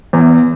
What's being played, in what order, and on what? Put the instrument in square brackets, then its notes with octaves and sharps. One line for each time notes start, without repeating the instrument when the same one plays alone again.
[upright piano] E2